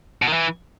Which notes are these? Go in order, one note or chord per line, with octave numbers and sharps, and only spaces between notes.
B2
D#3
E3